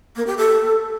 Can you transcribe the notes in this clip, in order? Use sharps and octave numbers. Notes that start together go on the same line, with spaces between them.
A#3
G4
A4